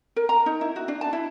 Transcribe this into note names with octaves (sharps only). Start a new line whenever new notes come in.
A#4
A#5
D#4
E4
F#4
D4
A5
E4